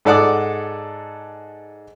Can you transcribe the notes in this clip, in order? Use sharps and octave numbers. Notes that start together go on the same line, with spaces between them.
G#2 A4 D5 F#5 D6 D#6